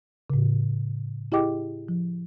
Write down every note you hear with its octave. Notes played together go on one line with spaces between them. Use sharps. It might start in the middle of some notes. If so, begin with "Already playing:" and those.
A2 C#3
E4 G4 G#4 D#5 G5 D6
F3